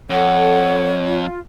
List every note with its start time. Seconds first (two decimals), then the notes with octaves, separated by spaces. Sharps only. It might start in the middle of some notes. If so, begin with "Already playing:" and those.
0.10 F2 A4 C#5 F#5
1.07 F4